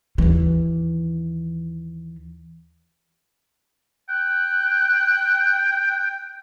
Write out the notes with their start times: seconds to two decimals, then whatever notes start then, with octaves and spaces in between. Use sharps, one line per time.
0.18 D#2 E3
4.09 G5 F#6